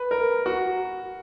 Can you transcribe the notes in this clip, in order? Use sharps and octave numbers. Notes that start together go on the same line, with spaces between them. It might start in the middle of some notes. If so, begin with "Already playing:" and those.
Already playing: B4
A#4
F#4